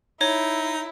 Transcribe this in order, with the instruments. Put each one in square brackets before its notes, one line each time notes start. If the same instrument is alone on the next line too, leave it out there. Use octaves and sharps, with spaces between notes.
[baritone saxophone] D#4 [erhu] E4 [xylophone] C#5